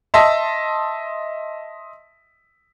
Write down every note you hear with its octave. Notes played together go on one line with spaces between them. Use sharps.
D#5 E5 A5 C6